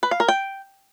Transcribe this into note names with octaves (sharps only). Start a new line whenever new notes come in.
B4
F5
A#4
G5